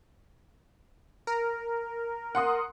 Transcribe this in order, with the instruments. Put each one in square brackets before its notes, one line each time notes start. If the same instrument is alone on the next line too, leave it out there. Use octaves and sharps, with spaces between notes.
[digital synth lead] A#4
[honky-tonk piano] F#5 C6 D#6